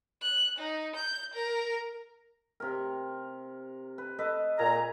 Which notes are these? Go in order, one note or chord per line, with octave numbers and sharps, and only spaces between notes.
F#6
D#4
G6
A#4
C3 A#4
B4
A4 B4 D#5
A#2 G#4 A#5